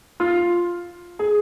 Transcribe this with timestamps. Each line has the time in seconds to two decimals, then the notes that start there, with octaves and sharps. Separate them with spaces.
0.20 F4
1.19 G#4